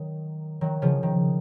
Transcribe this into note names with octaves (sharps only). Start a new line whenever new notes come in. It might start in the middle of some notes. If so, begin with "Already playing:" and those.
Already playing: D#3 F#3
D#3 F#3
C#3 F3
D#3